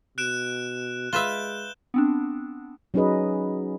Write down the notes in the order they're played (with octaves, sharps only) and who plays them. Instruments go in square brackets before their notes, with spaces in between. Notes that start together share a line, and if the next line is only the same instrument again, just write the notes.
[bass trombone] B2 [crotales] F#6 D7 E7
[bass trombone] G#3 [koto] F4 B4 E5 [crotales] G6 E7 G7
[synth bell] B3 C4 D4
[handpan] F#3 C#4 D#4 G#4 B4 D#5